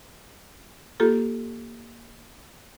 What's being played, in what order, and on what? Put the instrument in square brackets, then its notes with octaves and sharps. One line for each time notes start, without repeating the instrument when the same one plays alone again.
[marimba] A#3 F4 G4 A4